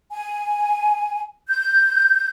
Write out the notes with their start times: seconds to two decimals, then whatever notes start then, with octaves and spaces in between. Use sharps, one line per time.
0.12 G#5
1.48 G6